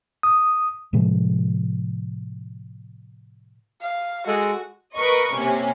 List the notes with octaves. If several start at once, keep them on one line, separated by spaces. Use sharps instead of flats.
D#6
A2 C3 F3 G#3
F5
G#3 F#4 A4
A#4 B4 D#5 C#6
C3 A#3 C#4